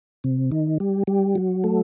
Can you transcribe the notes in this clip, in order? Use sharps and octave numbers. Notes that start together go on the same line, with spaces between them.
C3
D#3
G3
G3
F#3
A3